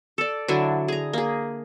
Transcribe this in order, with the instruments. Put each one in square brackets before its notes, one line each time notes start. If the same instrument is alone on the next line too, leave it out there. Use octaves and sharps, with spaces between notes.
[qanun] A4 D5
D3 F#3 D4 E4
G#4 A#5
A#3 G#4